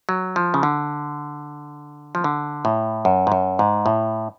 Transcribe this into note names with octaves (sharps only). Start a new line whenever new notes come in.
F#3
F3
C#3
D3
F3
D3
A2
F#2
G#2
F#2
G#2
A2